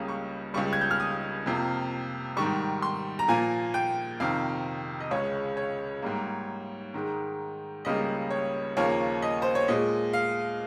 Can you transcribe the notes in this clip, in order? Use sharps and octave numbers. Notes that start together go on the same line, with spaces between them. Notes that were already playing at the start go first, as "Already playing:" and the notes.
Already playing: C#2 C#3 G3 A#3 D#6
C#6
C#2 C#3 G3 C#6
G#6
G6
F6
D#6
F2 C3 F3 A#3
G#2 D#3 G3 C#6
C6
A#5
A#2 F3 A#3 G#5
G5
F2 C3 D#3 F5
D#5
C#2 C#3 G#3 C#5
C#5
G#2 G3 A#3
G#2 D#3 G#3
C#2 C#3 G3 A#3 D#5
C#5
D#2 C#3 F3 A#3 C#5
D#5
C5
C#5
A#2 G#3 D#5
F5